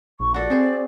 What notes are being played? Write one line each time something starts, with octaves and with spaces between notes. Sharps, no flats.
A#1 C#6
F#4 A4 D5
C4 G#4 C5